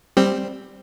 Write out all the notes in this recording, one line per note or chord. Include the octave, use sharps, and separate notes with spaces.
G3 C4